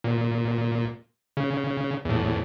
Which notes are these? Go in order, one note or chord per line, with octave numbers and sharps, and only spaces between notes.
A#2
C#3
E2 A2